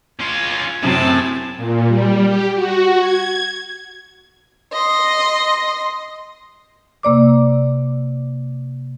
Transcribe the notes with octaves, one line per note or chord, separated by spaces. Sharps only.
C#4 F4 G#6
F#2 A2 C3 F#3 C4 A5
A#2
G3
G4
F#4
G#6
D#5 C6
C3 A#3 D5 D6